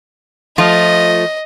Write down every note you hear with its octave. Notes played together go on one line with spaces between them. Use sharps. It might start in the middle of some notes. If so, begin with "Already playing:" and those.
F3 A3 F4 D#5